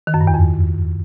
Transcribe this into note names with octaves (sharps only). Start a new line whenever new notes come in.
D#3
F#2
G2
E2
F2